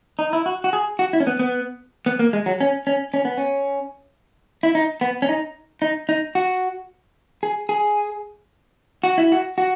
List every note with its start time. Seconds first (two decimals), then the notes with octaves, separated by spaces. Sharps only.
0.19 D#4
0.33 E4
0.46 F#4
0.64 F#4
0.73 G#4
0.99 F#4
1.13 E4
1.20 C#4
1.27 B3
1.39 B3
2.06 B3
2.19 A#3
2.33 G#3
2.46 F#3
2.61 C#4
2.87 C#4
3.14 C#4
3.25 B3
3.37 C#4
4.63 E4
4.75 D#4
5.01 B3
5.22 C#4
5.29 D#4
5.82 D#4
6.09 D#4
6.35 F#4
7.43 G#4
7.69 G#4
9.04 F#4
9.18 E4
9.32 F#4
9.58 F#4